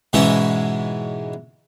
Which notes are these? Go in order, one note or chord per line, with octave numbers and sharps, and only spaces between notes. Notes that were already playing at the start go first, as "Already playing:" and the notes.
G#2 B2 E3 G#3 C#4 E4